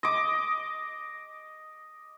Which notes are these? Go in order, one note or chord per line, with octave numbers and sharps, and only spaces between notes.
D#5 D6